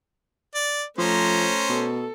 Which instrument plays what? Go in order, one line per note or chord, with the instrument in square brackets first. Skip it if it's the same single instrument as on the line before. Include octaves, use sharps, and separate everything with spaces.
[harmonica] D5
[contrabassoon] F3 [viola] A3 A#5 [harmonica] C#4 C5
[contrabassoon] B2 [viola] A4